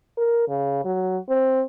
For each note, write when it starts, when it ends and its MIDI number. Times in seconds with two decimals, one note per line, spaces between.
0.17 0.47 70
0.49 0.82 49
0.85 1.18 54
1.29 1.63 60